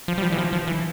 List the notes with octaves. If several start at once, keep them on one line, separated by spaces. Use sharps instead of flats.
F3
G3
F3
E3
F3
F3
E3